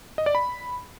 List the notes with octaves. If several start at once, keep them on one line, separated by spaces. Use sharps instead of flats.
D#5
D5
B5